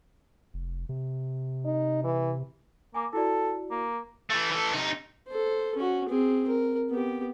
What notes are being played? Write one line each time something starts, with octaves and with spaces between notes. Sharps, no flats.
F1
C3
D#4
E3
A#3 G#5 D6
E4 F#4 A4 D5
A#3
E3 A3
E3 A4
C3 D#4
A4 C5
C#4 F#4
C4 G#4
A#4
B3 G4